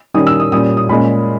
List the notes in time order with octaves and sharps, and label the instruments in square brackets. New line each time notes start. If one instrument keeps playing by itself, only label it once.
[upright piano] D#3 G3 C#4 D#6
E6
D#6
A#2 G3 C#4 D#6
D#6
A#2 G#3 C#4 B5